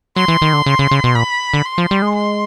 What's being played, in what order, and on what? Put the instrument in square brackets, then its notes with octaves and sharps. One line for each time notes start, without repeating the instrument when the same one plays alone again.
[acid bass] F#3 [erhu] C6
[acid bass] E3
D#3
D3
C#3
C#3
C#3
B2
[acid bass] A#2 [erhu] B5
[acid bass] D3
[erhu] C6
[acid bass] F3
G3
G#3
[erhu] C6